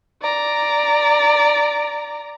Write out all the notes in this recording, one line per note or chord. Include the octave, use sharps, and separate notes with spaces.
D5 A#5